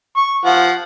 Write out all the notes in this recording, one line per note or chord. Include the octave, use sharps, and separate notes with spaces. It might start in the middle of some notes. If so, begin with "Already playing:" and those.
C#6
F3 F4 F#5